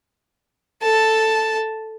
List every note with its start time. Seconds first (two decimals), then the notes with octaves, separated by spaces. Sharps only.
0.82 A4 A5